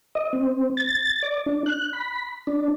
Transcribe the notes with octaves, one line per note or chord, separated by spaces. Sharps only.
D#5
C4
A6
D5
D4
F#6
B5
D4